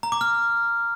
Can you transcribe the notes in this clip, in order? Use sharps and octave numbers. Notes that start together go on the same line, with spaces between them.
A#5
D6
F6